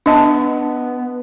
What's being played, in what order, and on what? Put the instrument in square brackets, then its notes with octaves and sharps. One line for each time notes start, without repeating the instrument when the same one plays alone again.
[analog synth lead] B3 [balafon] D4 D#5 A5